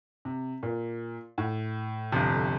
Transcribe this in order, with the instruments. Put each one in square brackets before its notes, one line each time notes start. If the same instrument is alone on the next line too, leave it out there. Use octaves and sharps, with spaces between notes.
[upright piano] C3
A#2
A2
[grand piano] G1 F2 C3